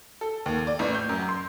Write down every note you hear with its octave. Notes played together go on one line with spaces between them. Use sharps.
A4
D#2
D5
A1
G6
F#2
C6